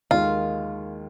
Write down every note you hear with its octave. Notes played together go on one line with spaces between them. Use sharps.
D#2 D#3 G#3 F4